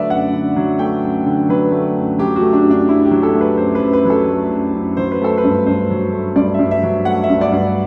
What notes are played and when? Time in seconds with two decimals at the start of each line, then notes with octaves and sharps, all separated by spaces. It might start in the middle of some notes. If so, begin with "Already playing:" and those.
Already playing: D3 F#3 A3 B4 D5 E5
0.10 F#2 F#5
0.33 D3
0.56 F#3
0.79 A3 G5
1.03 F#2
1.26 D3
1.49 F#3 B4
1.72 A3
1.96 F#2
2.18 F#3 G4
2.36 F#4
2.42 A3
2.53 D4
2.65 F#2
2.71 D4
2.89 F#2 E4
3.05 G4
3.11 F#3
3.23 A4
3.34 A3
3.41 B4
3.57 F#2 C5
3.75 B4
3.81 F#2
3.93 B4
4.05 F#3
4.10 A4
4.27 A3
4.51 F#2
4.74 F#2
4.97 F#3 C5
5.11 B4
5.21 A3 A4
5.38 B4
5.44 G2
5.66 G2 C5
5.90 F#3
6.13 A3
6.36 G2 D5
6.54 G2 E5
6.71 E5
6.83 F#3
7.05 A3 F#5
7.24 E5
7.29 G2
7.41 D5
7.52 G2